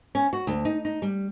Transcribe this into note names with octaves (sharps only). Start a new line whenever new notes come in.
C#4
F#4
D2
D#4
D#4
G3